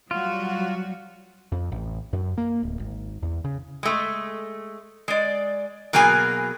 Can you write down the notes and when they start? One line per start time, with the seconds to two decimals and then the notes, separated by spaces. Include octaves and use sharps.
0.11 F#3 G3 F4 F#4
1.52 F2
1.72 A1
2.13 F#2
2.38 A#3
2.63 D1
2.80 G#1
3.23 E2
3.45 C#3
3.83 G#3 A3
5.08 G#3 D5
5.93 B2 F#3 A#3 G#4 G#5